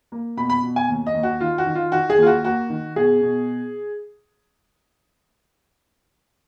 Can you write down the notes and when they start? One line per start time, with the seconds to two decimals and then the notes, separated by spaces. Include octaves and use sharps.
0.12 A#3
0.37 B2 B5
0.50 B5
0.63 B2
0.76 G#5
0.89 D#2
1.06 D#5
1.14 D#2
1.23 F#4
1.40 D#3 F4
1.58 F#4
1.66 D#3
1.75 F4
1.92 D#3 F#4
2.10 G#4
2.18 D#2 F4
2.27 F#4
2.44 A#3 F#4
2.70 D#3
2.96 B2 G#4
3.21 B2